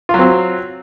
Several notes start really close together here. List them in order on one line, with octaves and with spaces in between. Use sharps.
F4 F#3 C4